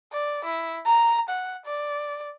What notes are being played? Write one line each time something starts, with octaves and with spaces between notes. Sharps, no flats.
D5
E4
A#5
F#5
D5